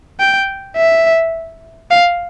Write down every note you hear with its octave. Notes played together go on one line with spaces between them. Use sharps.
G5
E5
F5